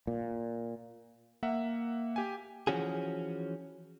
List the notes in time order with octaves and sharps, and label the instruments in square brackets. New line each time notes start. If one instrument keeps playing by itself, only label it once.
[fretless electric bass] A#2
[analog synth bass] A#3 [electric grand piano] E5 F#5
[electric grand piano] G4 G#5
[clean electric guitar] E3 F3 C#4 F#4 G#4